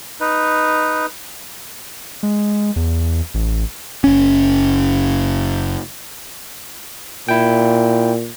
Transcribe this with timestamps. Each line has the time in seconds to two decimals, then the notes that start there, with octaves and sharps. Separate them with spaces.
0.20 D#4 B4
2.23 G#3
2.76 E2
3.34 A1
4.04 F#1 C#4
7.28 A#2 E4 G5